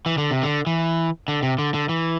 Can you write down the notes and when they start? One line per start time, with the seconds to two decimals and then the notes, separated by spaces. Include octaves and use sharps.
0.06 E3
0.18 D3
0.31 C3
0.43 D3
0.67 E3
1.28 D3
1.43 C3
1.59 D3
1.74 D3
1.89 E3